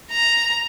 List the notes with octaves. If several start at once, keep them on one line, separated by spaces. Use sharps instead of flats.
A#5